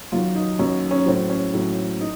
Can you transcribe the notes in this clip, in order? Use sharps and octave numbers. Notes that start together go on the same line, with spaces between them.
F#2 D#3 F#3 F4
D#4
F#2 D#3 F#3 C#4
C#4
A2 F#3 C4
C#4
A2 F#3
D#4